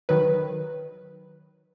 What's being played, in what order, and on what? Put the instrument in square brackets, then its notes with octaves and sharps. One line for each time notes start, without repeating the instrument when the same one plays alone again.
[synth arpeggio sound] D#3 F#3 B4